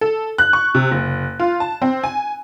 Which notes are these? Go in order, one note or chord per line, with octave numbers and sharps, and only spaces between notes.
A4
F#6
C#6
C3
F#1
F4
A5
C4
G#5